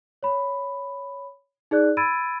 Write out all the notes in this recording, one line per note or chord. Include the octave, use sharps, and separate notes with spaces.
C#5 B5
D#4 G#4 D5 F#6
B5 E6 G#6 A6 D7 D#7